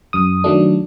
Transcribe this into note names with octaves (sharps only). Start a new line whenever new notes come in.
F#2 D#6
D#3 F#3 A3 D4